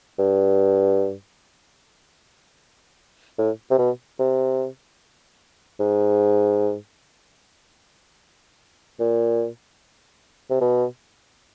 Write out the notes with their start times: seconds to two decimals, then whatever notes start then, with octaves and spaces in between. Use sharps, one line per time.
0.19 G2
3.38 A2
3.71 C3
3.78 B2
4.19 C3
5.80 G#2
9.00 A#2
10.50 C3
10.61 B2